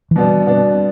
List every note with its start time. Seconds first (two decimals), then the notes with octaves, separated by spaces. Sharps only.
0.11 E3
0.15 B2 G3 B3 D4
0.47 B2 B3 D4